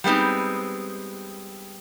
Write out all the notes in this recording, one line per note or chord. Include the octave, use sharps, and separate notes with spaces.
G3 G#3 B3 C4 D#4